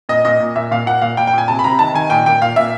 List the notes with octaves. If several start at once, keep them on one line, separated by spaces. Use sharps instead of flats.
A#2 D#5
A#2 D#5
A#2
A#2 E5
A#2 F5
A#2 F#5
A#2 F5
A#2 G5
G5
A#2 G#5
C3 A5
B5
C3 A#5
D#3 A5
D#3 G#5
A#2 G5
A#2 G5
A#2 F5
A#2 E5